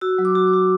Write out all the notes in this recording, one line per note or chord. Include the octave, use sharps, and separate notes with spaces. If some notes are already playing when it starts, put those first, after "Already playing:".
F#4 E6
F#3
D6
F#4
D6
F#4